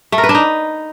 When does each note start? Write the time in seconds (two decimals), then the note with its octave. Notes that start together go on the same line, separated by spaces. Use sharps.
0.12 A3
0.18 A#4
0.24 B4
0.29 D4
0.35 D#4